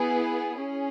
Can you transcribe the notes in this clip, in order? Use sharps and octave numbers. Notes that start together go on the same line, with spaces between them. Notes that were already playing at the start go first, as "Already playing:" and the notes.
Already playing: B3 E4 G#4
C#4 G#4